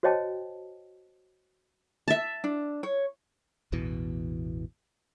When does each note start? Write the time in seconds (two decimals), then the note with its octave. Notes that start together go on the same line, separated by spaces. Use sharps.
0.03 F#4 C5 C#5 D#5 G5 A5
2.08 E5 A5
2.44 D4
2.83 C#5
3.72 A1 E2 B2 E3